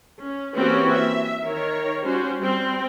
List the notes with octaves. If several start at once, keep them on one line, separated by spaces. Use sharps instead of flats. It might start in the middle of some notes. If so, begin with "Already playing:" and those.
C#4
E3 A#3 C4 C#4 F#4 G4
E5
D#3 A#4 C#5
G3 C#4 F#4 C5
G3 C4